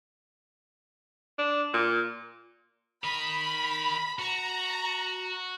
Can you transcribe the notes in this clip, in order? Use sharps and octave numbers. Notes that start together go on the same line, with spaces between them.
D4
A#2
A#4 D#5 B5
F#4 A#5